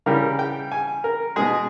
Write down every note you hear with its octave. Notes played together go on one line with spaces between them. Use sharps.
C#3 E3 G3 A#4
G5
G#5
A#4
B2 G#3 G#4